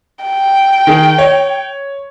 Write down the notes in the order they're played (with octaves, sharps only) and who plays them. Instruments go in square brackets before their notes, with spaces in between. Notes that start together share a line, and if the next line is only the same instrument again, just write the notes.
[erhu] G5
[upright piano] D#3 G#4
C#5